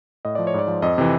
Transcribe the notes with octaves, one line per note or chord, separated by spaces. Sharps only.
A2 D#5
F3 D5
C#5
G#2 D5
F3
F2 D#5
C3 E3